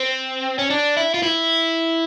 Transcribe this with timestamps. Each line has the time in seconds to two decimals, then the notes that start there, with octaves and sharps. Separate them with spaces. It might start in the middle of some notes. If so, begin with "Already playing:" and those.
Already playing: C4
0.59 C#4
0.70 D4
0.97 E4
1.14 F4
1.23 E4